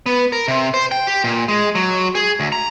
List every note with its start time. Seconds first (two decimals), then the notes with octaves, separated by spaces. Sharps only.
0.06 B3
0.32 A#4
0.48 C3
0.74 C5
0.91 G5
1.07 G4
1.24 A#2
1.48 G#3
1.75 F#3
2.15 G#4
2.40 D2
2.52 A#5